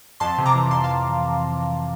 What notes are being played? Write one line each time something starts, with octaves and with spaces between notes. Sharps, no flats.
F2 A5 C6
C3
A#5 D6
E3
F2 A5 C6
F5 A5